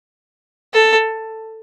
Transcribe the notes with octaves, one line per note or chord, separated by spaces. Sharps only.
A4